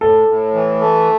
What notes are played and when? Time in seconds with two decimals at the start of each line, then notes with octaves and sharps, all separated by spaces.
0.01 A2 A4
0.28 A2
0.54 E3
0.81 A3